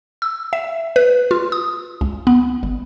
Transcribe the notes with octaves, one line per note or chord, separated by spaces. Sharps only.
E6
E5
B4
F4
D#6
C#2
B3
G1